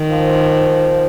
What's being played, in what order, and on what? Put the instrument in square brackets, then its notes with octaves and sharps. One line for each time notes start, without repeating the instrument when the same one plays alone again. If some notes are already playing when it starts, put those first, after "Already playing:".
Already playing: [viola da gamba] D#3
[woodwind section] F3